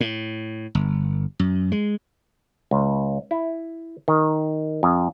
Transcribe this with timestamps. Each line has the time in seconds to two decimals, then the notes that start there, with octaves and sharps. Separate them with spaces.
0.01 A2
0.75 G1
1.39 F#2
1.72 G#3
2.71 C#2
3.31 E4
4.08 D#3
4.83 F2